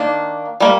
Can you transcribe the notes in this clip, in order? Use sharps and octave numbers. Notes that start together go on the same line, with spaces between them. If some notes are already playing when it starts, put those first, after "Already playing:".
Already playing: D#3 A#3 D4
G3 A#3